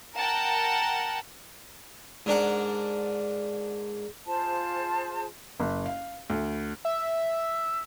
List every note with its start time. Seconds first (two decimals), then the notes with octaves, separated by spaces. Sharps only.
0.15 A#4 F#5 G5 A5
2.26 G#2 D4 A#4 F#5
4.25 F4 G#4 C5 A5
5.60 F#1
5.86 F5
6.30 D2
6.85 E5